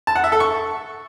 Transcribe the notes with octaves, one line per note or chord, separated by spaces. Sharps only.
A5
F#5
E5
A4
C#6